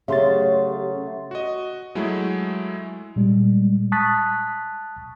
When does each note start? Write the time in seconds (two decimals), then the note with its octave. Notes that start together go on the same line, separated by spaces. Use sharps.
0.08 C#3 F#3 A3 G4 E5 C6 A6
1.31 F#4 D#5
1.95 F#3 G#3 A3 E4
3.16 A#2 G3 G#3
3.92 A5 C#6 D#6 F#6 A6 B6